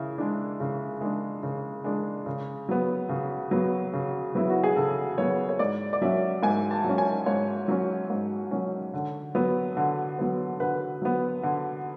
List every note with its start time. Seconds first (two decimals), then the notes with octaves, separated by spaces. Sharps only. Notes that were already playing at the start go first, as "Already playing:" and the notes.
Already playing: C#3 E4
0.18 G#3 D4
0.60 C#3
1.01 G#3 D4
1.43 C#3
1.84 G#3 D4
2.26 C#3
2.69 F#3 B3
3.09 C#3
3.51 F#3 B3
3.93 C#3
4.35 F#3 B3 E4
4.50 F#4
4.64 G#4
4.76 C#3 A4
5.18 F#3 B3 C#5
5.49 C#5
5.59 G#2 D5
5.93 D5
6.01 F#3 C#4 E5
6.43 G#2 G#5
6.71 A5
6.84 F#3 C#4
6.98 G#5
7.26 G#2 C#5
7.68 F#3 C#4
8.10 G#2
8.51 F#3 C#4
8.94 D3
9.35 F#3 B3
9.77 D3
10.19 F#3 B3
10.60 D3 B4
11.02 F#3 B3
11.43 D3